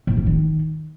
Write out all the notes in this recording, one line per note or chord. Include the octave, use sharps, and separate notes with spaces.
A2
F2
D#3